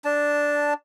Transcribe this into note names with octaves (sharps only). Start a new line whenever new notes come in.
D4 A5